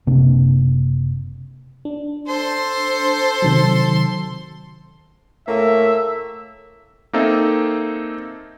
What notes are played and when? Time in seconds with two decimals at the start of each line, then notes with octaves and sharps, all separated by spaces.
0.07 F#1 C3 A#3 D4
1.85 D4
2.28 A4 C5 C6
3.42 C3 D#3 F#3
5.47 A2 A#3 E5
7.13 A#3 C4 D#4 A4 E5